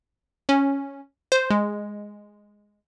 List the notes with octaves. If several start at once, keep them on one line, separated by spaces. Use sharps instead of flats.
C#4
C5
G#3